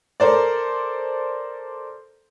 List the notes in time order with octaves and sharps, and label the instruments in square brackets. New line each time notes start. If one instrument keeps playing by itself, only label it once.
[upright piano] A4 A#4 C5 D5